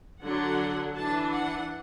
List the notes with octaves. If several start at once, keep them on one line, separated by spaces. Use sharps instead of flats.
D3 F#3 D4 F#5
E3 D4 A5
F#5